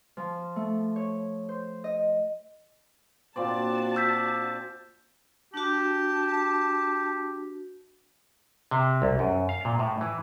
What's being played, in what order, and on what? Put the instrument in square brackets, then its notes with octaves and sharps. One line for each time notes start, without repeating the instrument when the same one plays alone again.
[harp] F3
A3
C#5
C5
D#5
[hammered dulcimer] A#2 C4 D5 [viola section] D4 F#4 A5
[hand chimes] E6 G6 B6
[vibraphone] D4 F#4 [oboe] G4 [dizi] A5
[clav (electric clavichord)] C3
C2
F#2
F5
A#2
A2
E3